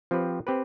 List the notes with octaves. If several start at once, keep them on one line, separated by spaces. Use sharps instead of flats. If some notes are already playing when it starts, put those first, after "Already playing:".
F3 C4 G4 B4
C4 G4 B4